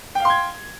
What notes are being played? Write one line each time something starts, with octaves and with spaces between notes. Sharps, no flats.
F5 G5 C6 G#6